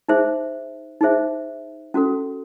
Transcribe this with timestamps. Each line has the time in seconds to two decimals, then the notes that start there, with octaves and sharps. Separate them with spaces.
0.09 D#4 G#4 C5 E5
1.01 D#4 G#4 C5 E5
1.94 C#4 F#4 A4